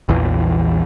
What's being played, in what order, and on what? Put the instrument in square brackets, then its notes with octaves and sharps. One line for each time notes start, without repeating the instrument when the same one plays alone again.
[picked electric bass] A#1 E2 E3